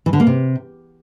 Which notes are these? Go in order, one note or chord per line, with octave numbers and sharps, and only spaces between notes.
E3
D3
A#3
C3